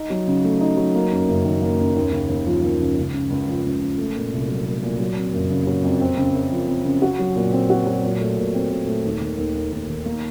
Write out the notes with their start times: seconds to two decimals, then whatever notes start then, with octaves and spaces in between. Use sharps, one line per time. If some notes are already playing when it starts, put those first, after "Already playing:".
Already playing: D#4
0.10 F#3
0.27 C#3
0.44 A3
0.61 D#4
0.77 F#3
0.95 A#3
1.12 F#2
1.28 F#1
1.45 D#3
1.62 A#3
1.79 F#2
1.96 D#2
2.12 C#3
2.29 D#2
2.46 F3
2.63 D#2
2.81 C#3
2.97 C#2
3.14 C#3
3.30 C#2
3.48 F3
3.64 C#2
3.81 C#3
3.98 A3
4.16 A#2
4.32 C2
4.48 F#3
4.66 A3
4.83 A#2
4.99 F#3
5.16 F2
5.33 F#1
5.50 C#3
5.67 F#3
5.84 F2
6.01 C4
6.17 C#3
6.34 F#2
6.52 F3
6.68 C4
6.85 C#3
7.02 F#4
7.19 F#3
7.36 A#2
7.53 C4
7.70 F#4
7.87 F#3
8.03 A#2
8.20 A3
8.37 A#2
8.54 C4
8.71 A#2
8.87 A3
9.05 D#2
9.21 D#3
9.38 D#2
9.56 A#3
9.72 D#2
9.89 D#3
10.06 A#3